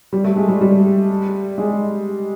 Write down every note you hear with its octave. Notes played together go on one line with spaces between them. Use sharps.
G3
A3
G#3
G3
G3
G#3